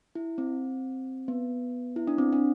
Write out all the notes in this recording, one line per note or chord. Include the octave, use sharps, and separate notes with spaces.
E4
C4
B3
E4
D4
C4
D4